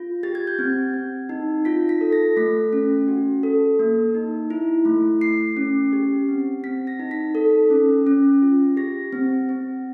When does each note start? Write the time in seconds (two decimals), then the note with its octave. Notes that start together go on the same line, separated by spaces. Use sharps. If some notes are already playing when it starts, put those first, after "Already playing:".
Already playing: F4
0.23 G4 A6
0.35 G#6
0.47 G6
0.59 C4 G#6
0.94 C4
1.29 D#4
1.65 F4 B6
1.89 B6
2.01 A4
2.13 A#6
2.37 A3 B6
2.73 C#4
3.08 F#4
3.43 A4
3.79 A#3
4.14 D#4
4.50 E4
4.85 A3
5.21 A3 C7
5.57 C#4
5.93 G4
6.28 C4
6.64 C4 B6
6.87 A#6
7.00 D#4
7.11 B6
7.35 A4
7.70 C#4
8.07 C#4
8.42 F4
8.77 G4 A#6
9.13 C4
9.49 C4